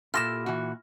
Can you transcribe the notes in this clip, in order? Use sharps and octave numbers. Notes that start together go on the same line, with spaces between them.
A#2 E4 F4 G4 A4 F6 A#6 E7
E3 F#4